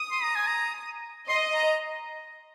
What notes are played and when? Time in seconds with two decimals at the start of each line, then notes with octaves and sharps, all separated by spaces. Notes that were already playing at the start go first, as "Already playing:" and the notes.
Already playing: D#6
0.11 C6
0.23 A#5
0.35 G#5
0.47 A#5
1.29 D#5 C6
1.54 A#5